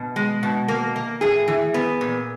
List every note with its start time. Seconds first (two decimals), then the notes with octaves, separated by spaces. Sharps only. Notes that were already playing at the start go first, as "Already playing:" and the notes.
Already playing: B2
0.16 G#3
0.43 B2
0.68 A#3
0.96 A#3
1.21 A2 G#4
1.48 E3
1.74 B3
2.01 A#2